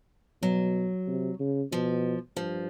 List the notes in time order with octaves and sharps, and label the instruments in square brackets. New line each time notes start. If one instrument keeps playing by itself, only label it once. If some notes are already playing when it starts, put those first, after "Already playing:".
[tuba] B2 [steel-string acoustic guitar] F#3
[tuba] C3
C#3
[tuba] B2 [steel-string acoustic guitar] F3
[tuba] G2 [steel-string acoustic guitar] F3